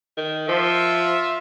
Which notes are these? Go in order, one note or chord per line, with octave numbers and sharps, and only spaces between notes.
D#3
F3 F4 E5